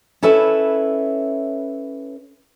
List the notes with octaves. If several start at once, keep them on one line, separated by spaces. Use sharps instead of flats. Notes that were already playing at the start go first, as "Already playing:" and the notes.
C#4 E4 A4 B4 C#5 E5